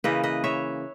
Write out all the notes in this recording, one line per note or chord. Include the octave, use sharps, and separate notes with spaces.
C#3 E3 A#3 B4 D#5
B4 D#5
C#5 E5